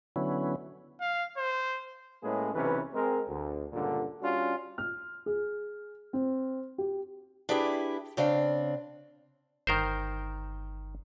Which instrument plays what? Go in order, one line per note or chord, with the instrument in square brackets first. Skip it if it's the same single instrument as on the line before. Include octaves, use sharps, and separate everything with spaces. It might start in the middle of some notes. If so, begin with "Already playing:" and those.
[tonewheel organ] D3 F#3 B3 C#4 E4
[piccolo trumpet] F5
C5
[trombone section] A2 G#3 A#3 C#4 G#4 B4
B1 C3 E3 C#4 B4
G#3 C4 A#4
D2
C#2 G2 A#2 D3
G3 C#4 D4 F4 F#4
[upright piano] F6
G#4
C4
G4
[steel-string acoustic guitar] D4 E4 G4 G#4 B4
C#3 C4 D4 F5
[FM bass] G1 [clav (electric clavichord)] D#3 A#4 C5